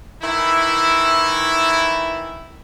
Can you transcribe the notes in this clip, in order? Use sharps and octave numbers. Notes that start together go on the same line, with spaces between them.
D#3 E3 E4